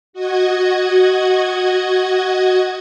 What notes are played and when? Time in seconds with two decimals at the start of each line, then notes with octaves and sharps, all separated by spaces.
0.13 F#4 D#5 F#5 G#6